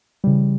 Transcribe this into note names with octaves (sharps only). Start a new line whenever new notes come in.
C#3 E3 G3